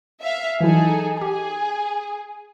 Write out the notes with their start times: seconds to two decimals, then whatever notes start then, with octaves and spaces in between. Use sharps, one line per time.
0.21 E5 F5
0.61 E3 F#3 D#4 E4 G#4 A4
1.17 G4 G#4 G#5